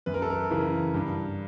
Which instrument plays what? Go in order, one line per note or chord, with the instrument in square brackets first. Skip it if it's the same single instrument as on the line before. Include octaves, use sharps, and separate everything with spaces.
[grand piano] F#2 B4
A#4
A4
A#4
C#3 E3
G2